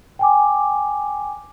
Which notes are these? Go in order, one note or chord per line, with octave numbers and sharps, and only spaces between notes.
G5 G#5 D6